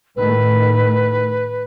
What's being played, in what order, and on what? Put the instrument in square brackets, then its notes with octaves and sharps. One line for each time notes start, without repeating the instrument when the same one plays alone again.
[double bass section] A2 D#3 A3 [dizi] B4